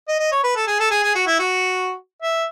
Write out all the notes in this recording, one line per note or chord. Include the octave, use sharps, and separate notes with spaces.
D#5
D#5
C#5
B4
A4
G#4
A4
G#4
G#4
F#4
E4
F#4
E5